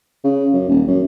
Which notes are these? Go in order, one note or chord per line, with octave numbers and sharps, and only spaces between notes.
C#3
F#2
D#1
F#2